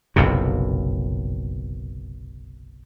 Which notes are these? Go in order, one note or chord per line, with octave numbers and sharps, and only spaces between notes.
F#1 B1 F2 C3